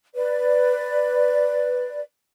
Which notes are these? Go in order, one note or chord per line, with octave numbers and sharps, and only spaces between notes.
B4 D5